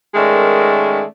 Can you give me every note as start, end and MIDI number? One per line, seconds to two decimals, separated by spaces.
0.15 1.03 51
0.15 1.03 56
0.15 1.03 57
0.15 1.03 61
0.15 1.03 70
0.15 1.03 74